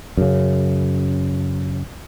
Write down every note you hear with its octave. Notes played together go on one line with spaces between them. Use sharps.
F#2 C#3